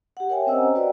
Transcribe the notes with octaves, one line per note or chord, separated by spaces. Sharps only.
G4 F#5
A#4 C#5 E5 G5 G#5
C4 C#4 C5 D#5 F#5 E6
A#5
F#4 B4 D5 D#5 F#5 G5